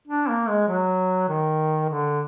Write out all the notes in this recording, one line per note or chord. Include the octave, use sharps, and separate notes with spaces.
D4
A#3
G#3
F#3
D#3
D3